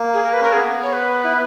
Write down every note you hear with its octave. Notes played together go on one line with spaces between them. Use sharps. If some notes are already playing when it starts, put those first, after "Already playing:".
Already playing: A#3
G#4
A#4
B4
C#4 A#4
B3 G#4
C#5
B4
E4